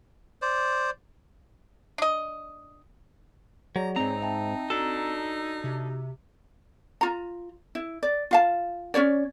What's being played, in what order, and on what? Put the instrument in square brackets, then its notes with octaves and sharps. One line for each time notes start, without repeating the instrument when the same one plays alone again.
[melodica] C5 D5
[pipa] D4 D#5
[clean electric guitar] F#3 [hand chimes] G#4 C#5 D5 [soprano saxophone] A#5
[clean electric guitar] G#2 A#5 [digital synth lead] C4 [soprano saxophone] D#4
[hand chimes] E5 G5 A5
[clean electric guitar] D4 A4 [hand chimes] F#4 A#5 E6
[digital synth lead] C3
[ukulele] F4 A#5
E4
D5
F4 F5 A5
C#4 G4 C#5 D5